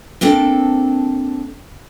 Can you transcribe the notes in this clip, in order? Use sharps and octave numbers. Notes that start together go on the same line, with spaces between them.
A#3 C4 D4 A4